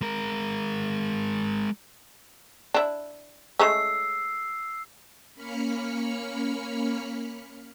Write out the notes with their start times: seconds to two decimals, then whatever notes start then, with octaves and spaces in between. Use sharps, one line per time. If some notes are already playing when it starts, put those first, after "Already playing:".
0.01 G#3 A#4
2.74 D4 E4
3.59 G#3 A3 C#4 E6 C7
5.35 A#3 C#4 B5 F6 B6 C#7